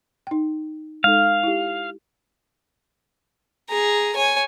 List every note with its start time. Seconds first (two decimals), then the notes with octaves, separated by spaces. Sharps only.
0.27 D#4 G5
1.04 G#3 D#4 A4 F5
1.43 E4 G4
3.70 G#4 A#5
4.15 C#5 G#5